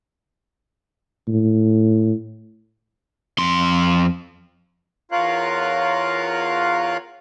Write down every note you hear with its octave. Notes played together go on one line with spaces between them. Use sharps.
A2
F2 C6
E2 F4 A#4 C#5 F5 F#6